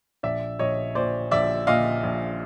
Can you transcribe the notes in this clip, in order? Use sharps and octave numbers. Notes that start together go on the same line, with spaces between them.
A#1 D5 E5
A#1 C#5 D#5
A#2 C5 D5
A#1 D5 E5
A#2 D#5 F5
A#1